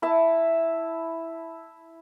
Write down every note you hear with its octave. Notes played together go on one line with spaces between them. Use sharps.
E4 E5 A5